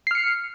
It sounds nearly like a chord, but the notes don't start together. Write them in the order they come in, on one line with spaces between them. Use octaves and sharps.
C7 F6 C#7